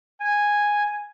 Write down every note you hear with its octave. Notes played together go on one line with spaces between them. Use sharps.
G#5